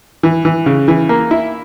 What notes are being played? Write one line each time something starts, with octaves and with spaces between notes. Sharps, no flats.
E3
E3
C#3
E3
A#3
E4